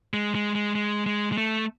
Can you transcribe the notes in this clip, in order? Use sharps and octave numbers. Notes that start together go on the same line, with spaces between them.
G#3
G#3
G#3
G#3
G#3
G#3
A3